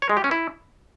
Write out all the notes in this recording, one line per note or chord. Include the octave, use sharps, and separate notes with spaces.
C#5
G#3
G4
C#4
E4